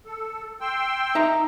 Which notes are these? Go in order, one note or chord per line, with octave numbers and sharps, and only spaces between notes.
A4
G5 C6 E6
D#4 E5 A#5